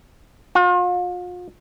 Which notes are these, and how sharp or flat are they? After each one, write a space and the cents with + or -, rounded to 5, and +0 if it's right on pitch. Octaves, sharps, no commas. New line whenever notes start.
F4 +40